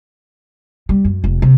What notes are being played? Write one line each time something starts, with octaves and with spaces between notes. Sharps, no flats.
G3
F#2
F1
C3